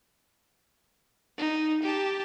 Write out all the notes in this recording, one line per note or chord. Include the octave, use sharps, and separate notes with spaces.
D#4
G4 A5